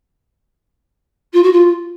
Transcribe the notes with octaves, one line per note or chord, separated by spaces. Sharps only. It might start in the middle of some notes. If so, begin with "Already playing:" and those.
F4
F#4
F4